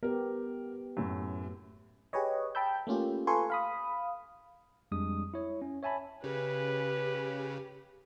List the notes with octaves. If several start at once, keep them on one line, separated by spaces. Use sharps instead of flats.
B3 G4 A#4
F#2 A2
G4 G#4 B4 C#5 D#5
G5 A5 B5 E6 G6
A3 A#3 C#4 F4 G4
F4 A4 B4 G#5 C6 C#6
F5 B5 D#6
F2 G3 G#3 D4 D#6
E4 C#5
C#4
C#5 E5 G#5 A5 B5
C#3 G4 B4